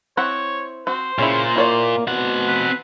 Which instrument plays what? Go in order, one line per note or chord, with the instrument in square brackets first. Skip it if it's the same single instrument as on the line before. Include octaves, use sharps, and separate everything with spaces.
[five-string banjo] C4 E4 F#5 [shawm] C#5
[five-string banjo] C4 F#4 [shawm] C5
[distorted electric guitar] A#2 [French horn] C#3 [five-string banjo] C#4 E4
[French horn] A#3 [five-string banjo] E4 C#5 D5
[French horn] B2 [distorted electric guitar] C4 F#5
[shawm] B4